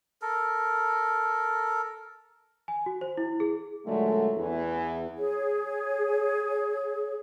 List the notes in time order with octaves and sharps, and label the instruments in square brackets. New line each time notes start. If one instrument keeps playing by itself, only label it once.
[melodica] A4 A#4
[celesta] G#5
F#4
C5
E4
G#4
[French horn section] A#2 D3 F#3 G#3 A3
E2 E3
[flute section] G#4 C#5